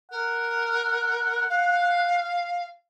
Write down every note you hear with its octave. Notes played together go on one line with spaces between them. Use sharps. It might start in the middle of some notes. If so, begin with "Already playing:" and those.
A#4 F#5
F5